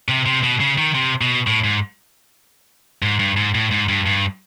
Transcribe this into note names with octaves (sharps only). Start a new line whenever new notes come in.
C3
C3
B2
C#3
D#3
C3
B2
A2
G#2
G#2
G2
G#2
A2
G#2
G2
G2